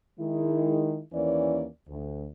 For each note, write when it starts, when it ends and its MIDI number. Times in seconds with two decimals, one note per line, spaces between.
0.19 1.01 51
0.19 1.01 56
0.19 1.01 64
1.13 1.67 39
1.13 1.67 52
1.13 1.67 58
1.13 1.67 61
1.13 1.67 74
1.89 2.27 38